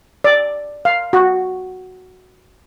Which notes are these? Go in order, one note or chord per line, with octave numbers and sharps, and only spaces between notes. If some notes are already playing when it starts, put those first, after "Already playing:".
D5
F5
F#4